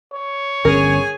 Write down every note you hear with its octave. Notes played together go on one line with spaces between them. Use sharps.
C#5
G1 D3 C#4 G#4 A#4 G#5